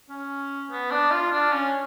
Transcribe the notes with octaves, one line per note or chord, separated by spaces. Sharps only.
C#4
B3
D4
F4
D4
C#4